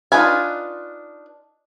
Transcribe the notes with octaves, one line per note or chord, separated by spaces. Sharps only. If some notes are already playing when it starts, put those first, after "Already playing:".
D4 D#4 F4 B4 G#5